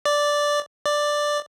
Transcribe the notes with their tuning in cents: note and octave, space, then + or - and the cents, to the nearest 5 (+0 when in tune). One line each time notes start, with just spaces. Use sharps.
D5 -5
D5 +5